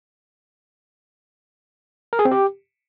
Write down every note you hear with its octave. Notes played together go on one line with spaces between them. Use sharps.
A#4
G#4
C4
G4